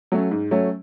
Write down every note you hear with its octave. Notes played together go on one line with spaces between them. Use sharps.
F#3 A3 C#4
G#2
F#3 A3 C#4